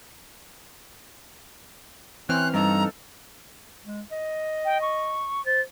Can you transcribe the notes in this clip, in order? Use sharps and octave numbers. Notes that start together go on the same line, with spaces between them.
E3 C4 C#4 C5 F6 F#6
G2 D#4 A4 A#5
G#3
D#5
G5
C#6
C5 A6